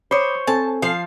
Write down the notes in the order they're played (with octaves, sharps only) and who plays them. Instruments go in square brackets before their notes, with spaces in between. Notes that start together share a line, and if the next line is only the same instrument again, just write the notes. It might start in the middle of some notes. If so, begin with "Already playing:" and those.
[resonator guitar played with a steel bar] C5 C#5 [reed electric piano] B5 D6 D#6
[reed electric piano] C4 A4 G#5 [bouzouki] A5
[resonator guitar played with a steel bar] F3 [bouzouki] F5